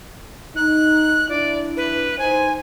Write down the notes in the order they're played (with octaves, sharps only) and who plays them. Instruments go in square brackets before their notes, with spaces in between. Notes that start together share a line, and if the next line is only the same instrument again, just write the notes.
[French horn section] D#4 [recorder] F#6
[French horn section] D4 E4 [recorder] D5
[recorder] B4
[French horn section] D#4 C5 [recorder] G#5